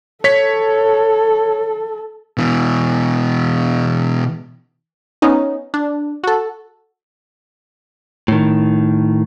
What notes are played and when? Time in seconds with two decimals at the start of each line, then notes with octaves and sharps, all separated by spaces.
0.24 A4 C#5 B6
2.37 B2 E3
5.22 B3 C#4 D#4
5.74 D4
6.24 F#4 A4
8.28 A2 D#3